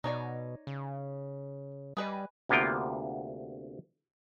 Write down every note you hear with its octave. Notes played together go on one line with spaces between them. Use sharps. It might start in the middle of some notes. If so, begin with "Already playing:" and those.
B2 D#4 C#5 D5
C#3
G3 G#4 B4 D#5
D2 C3 A#3 B3 F4 G5